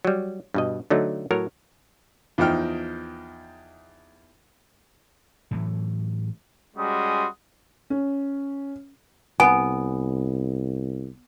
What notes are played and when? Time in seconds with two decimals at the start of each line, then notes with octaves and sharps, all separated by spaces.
0.05 F#3 G3
0.54 G2 B2 D#5
0.90 D3 F#3 A3 D#4
1.31 A2 F#3 A#4 C#5
2.38 E2 F3 D#4 G5 F6
5.51 A2 E3 F#3
6.77 G3 G#3 C#4 F#4 C6 D#6
7.90 C#4
9.40 C2 B3 G#5